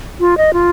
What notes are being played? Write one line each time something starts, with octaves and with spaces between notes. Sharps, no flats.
F4
D#5
F4